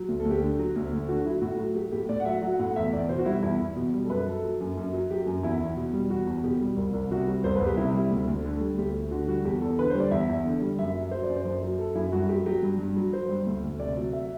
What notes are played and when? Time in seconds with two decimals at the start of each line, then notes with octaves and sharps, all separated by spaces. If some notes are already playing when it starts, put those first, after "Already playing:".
Already playing: F#3
0.08 D2
0.20 A4
0.25 D2
0.31 G4
0.42 D3
0.59 F#3
0.76 D2
0.92 D2
1.09 D3 F#4
1.25 F#3 E4
1.42 A2 F#4
1.59 F#3
1.75 F#3 G4
1.92 A2 G4
2.09 A2 D5
2.20 F#5
2.25 F#3 E5
2.42 F#3 F#5
2.59 A2 F#5
2.76 E2 E5
2.93 E2 D5
3.09 B2 C5
3.18 F#4
3.26 G3 E4
3.42 E2 E4
3.60 E2
3.76 B2
3.94 G3
4.04 A4
4.09 F#2 B4
4.26 F#3 A4
4.44 F#3
4.61 F#2
4.77 F#2
4.93 F#3
5.10 F#3 G4
5.27 F#2
5.43 E2 E4
5.60 E2
5.77 B2
5.93 G3
6.10 E2 F#4
6.27 E2
6.44 B2 G4
6.60 G3
6.77 C2
6.93 C2
7.11 C3 F#4
7.28 G3
7.44 C2 C5
7.56 B4
7.61 C2
7.66 G4
7.77 C3 E4
7.94 G3
8.11 D2
8.27 D2
8.45 D3
8.61 G3
8.78 D2 G4
8.94 D2
9.11 D3 F#4
9.28 G3 F#4
9.45 E2 G4
9.61 E2 A4
9.79 D3 B4
9.90 C5
9.95 G3
10.00 D5
10.11 E2 E5
10.29 E2
10.46 D3
10.62 G3
10.78 F#2 E5
10.95 F#3
11.11 F#3 C5
11.23 D5
11.29 F#2
11.36 C5
11.45 F#2
11.63 F#3
11.79 F#3 A4
11.95 F#2 E4
12.12 G2 F#4
12.29 F#3 G4
12.46 F#3 G4
12.63 G2
12.79 G2
12.97 F#3
13.13 F#3 C5
13.29 G2
13.46 D2
13.63 D2
13.80 C3 D5
13.97 F#3
14.13 E5